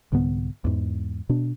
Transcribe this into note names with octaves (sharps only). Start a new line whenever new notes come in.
C2 G#2 D3 B3
E2 G#2
B2 D4